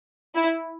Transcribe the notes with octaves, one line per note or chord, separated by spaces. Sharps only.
E4